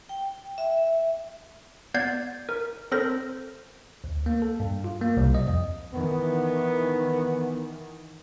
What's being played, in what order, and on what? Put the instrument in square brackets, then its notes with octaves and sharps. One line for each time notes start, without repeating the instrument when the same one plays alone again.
[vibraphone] G5
E5
[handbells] B3 D5 G6 G#6 C7
A#4
C4 A4 A#4 C5 A#6
[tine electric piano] D2
A#3
A4
G2
F4
A#3
C2
D#5
F2
[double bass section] D#3 E3 [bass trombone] B3